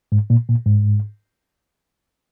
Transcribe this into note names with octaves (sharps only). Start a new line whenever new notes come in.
G#2
A#2
A#2
G#2